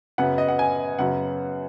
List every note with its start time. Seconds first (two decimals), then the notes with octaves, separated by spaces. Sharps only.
0.18 F#2 C#3 B3 F#5
0.38 D#5
0.48 F#5
0.59 G#5
0.99 F#2 C#3 F#3 B3 F#5